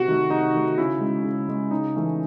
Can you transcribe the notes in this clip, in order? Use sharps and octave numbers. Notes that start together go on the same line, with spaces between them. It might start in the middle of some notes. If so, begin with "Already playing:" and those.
Already playing: C3 F#4
D#3 A3
C3 D#4
D#3 A3
C#3 E4
G#3 C#4
C#3
G#3 C#4
C#3 D#4
E3 A3 C#4